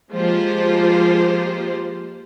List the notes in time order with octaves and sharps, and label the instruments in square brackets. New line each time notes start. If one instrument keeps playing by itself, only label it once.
[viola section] F3 G#3 A#3 F4 G4 C5